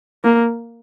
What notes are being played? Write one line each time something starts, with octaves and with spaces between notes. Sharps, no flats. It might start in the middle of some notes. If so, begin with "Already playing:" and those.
A#3